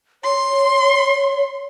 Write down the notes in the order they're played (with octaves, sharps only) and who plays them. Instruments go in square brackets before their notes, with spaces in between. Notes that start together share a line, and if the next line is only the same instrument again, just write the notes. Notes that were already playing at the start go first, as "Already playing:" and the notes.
[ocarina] C#5 [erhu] C6